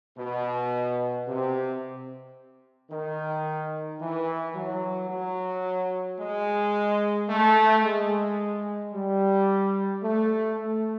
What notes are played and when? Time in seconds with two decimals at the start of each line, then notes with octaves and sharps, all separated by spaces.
0.18 B2
1.27 C3
2.91 D#3
4.00 E3
4.56 F#3
5.09 F#3
6.20 G#3
7.29 A3
7.84 G#3
8.93 G3
10.03 A3
10.58 A3